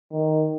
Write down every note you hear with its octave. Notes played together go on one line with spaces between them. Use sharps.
D#3